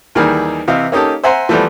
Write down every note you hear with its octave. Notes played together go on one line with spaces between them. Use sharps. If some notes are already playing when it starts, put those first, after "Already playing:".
D#2 D#3 E3 G3 G#4 F6
C3 E3 D#5 F5
A#3 C#4 D#4 G4 A4
C5 E5 F#5 G#5 A#5 C6
E3 F3 G3 A3 B3